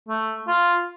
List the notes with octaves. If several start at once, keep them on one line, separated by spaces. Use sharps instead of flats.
A3
F4